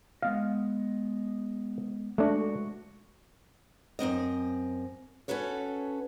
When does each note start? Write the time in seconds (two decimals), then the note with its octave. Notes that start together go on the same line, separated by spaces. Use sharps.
0.22 G#3 B3 D#5 F5
2.18 G#3 A3 D4 F#4
3.99 F#2 D#3 C4 D#5
5.28 C#4 F#4 A4 B4 C#5